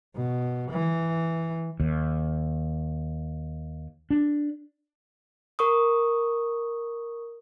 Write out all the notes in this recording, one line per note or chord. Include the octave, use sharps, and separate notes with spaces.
B2
E3
D#2
D4
A#4 C#6 D#6